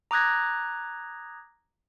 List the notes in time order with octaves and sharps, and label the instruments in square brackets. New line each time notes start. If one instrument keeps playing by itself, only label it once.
[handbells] A#5 D6 D#6 F#6 G#6 A#6